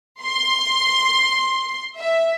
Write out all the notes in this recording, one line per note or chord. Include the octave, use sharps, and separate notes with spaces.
C6
E5